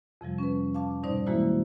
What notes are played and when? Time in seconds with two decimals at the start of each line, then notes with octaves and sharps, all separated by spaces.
0.21 F2 C3 F3 G3
0.38 C#4 B4
0.75 F5 A5 D6
1.03 G#2 B2 G3 D#4 C5 D5
1.26 E3 G#3 A#3 E4 F#4 C5